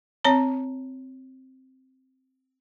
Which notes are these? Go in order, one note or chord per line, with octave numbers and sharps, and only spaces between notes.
C4 C#5 A#5